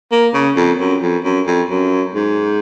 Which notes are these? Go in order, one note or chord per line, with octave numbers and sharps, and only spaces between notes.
A#3
C#3
F2
F#2
F2
F#2
F2
F#2
G#2